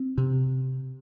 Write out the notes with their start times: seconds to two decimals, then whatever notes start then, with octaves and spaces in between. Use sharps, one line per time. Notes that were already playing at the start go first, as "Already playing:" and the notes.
Already playing: C4
0.18 C3